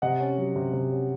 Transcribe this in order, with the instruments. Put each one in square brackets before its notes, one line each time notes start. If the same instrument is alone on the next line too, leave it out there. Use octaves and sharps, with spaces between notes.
[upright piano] C3 D#5 F#5
C#4
F#3
C3
C3
C#4